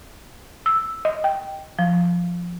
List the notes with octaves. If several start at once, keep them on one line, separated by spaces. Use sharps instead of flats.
E6
D#5
G5
F3